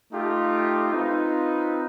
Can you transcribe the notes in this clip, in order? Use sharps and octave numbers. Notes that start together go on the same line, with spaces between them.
A3 D#4 F4 G4
C4 D#4 F4 B4